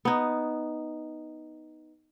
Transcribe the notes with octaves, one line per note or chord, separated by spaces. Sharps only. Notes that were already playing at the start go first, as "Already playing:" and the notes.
B3 D#4